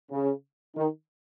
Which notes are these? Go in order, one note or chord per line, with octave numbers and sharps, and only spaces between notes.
C#3
D#3